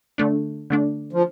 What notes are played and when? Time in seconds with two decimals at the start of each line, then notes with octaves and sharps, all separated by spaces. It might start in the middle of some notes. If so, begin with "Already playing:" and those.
0.18 D3 A3 D4
0.70 D3 A3 D4
1.13 F3